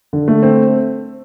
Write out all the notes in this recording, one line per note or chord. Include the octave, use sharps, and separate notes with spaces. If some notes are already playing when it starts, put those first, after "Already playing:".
D3
A3
C4